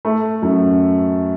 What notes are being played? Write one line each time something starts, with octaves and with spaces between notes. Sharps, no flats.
A3
F#2